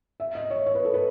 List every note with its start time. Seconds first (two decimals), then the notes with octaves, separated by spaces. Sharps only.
0.20 E5
0.35 D#5
0.50 C#5
0.66 C#5
0.75 B4
0.85 A4
0.94 B4